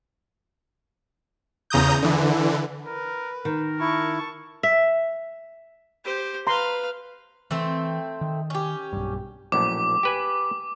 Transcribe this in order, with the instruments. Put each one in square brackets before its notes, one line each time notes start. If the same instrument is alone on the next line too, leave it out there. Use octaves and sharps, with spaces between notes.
[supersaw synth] E2 C#3 A#5 D#6 G6
D3 E3
[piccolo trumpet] A#4 [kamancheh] B4
[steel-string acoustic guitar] D#3 [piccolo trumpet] A#4
[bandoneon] E4 [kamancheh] A5 C#6
[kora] E5
[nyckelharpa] G4 C5
[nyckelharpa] B4 F5 [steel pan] A#5 C6
[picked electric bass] E3 [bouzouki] A3 C4
[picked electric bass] D#3
[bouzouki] C#4 G4
[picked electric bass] B1 G2
[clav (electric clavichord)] A#1 F#2 A2 [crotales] D6
[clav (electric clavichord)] G4 B4 G#5